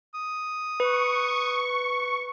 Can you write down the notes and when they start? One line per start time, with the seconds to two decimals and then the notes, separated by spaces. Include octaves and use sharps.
0.14 D#6
0.80 B4 C#6